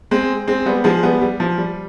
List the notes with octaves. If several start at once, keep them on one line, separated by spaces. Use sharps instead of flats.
G#3 C4
G#3 C4
G3 B3
F3 G#3
G3 B3
G3
F3
G3